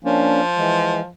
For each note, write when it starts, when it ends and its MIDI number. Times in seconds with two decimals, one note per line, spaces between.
0.05 1.12 53
0.05 0.41 58
0.05 0.41 61
0.05 0.41 62
0.57 1.01 52
0.57 1.01 56